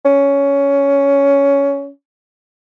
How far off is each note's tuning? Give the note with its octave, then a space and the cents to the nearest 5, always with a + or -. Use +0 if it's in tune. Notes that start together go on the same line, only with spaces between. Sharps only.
C#4 +15